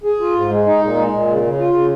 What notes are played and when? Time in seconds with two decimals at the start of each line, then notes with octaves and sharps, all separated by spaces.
0.04 G#4
0.20 F4
0.35 G#2
0.50 G#3
0.66 D#4
0.81 A#2
0.96 G#3
1.12 A#2
1.28 C#3
1.43 C#3
1.58 F4
1.74 C#3